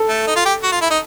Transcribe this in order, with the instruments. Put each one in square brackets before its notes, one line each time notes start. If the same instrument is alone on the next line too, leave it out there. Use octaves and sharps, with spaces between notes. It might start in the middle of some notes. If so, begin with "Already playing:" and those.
Already playing: [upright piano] A4
[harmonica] A3
D#4
F4
G4
F#4
F4
E4
D#4